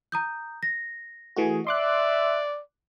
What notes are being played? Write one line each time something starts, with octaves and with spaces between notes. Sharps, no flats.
A#5 D#6 G6
A#6
E3 A3 F#4 G#4
D5 E5 C6 D6 F#6